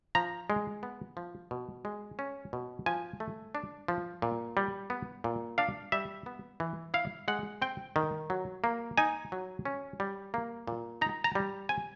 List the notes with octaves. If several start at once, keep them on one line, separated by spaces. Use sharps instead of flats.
F3 A#5
G#3
B3
F3
B2
G#3
C#4
B2
F3 G#5
A3
D4
F3
A#2
G3
B3
A#2
D4 F5
G3 E5
B3
E3
E4 F5
G#3 F#5
C4 G5
D#3
F#3
A#3
D#4 G#5
F#3
C#4
G3
A#3
A#2
D#4 A#5
A#5
G3
C4 G#5